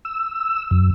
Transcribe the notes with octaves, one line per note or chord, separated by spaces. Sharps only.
E6
F#2